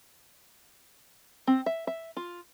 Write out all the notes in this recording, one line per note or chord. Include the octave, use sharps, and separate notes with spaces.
C4
E5
E5
F4